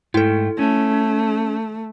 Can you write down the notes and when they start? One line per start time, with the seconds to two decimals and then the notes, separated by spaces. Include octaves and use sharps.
0.14 G#2 A3 E4 A4 G5
0.59 A3 C#4